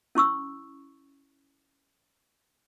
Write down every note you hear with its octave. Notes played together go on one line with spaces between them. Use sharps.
C#4 E4 C#6 E6